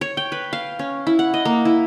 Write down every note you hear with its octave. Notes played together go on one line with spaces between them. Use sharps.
C#5
G5
B4
F5
C#4
E4
F#5
D#5
A#3
E4